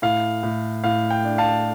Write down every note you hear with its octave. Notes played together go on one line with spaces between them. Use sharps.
A2 F5
A2
A2 F5
G5
D4
F5 A5